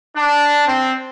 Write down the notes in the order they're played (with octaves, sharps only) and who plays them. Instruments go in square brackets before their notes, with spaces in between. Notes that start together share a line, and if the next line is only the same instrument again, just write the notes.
[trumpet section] D4
C4